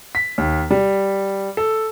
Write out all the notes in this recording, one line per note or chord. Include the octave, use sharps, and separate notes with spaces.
B6
D#2
G3
A4